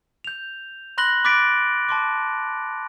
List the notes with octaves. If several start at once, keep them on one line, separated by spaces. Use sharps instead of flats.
G6 F7
B5 C6 F#6 A#6 F#7 G7
B5 D6 F#6 A6 B6 D7
A5 C6 D6